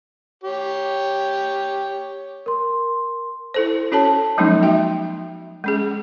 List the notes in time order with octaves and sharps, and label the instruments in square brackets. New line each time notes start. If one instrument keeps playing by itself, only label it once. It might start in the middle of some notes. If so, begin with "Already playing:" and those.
[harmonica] G4 C#5
[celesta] A#4 C6
[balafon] E4 A4 C5
C#4 F#4 A4 C#5 A5
F3 F#3 G#3 A#3 C#4 D#4
F#4 E5 G5
G#3 C#4 G#4